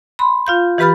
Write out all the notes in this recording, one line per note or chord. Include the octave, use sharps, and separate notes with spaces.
B5 C6
F4 F5 G6
E3 G4 B4 B5 F6 A6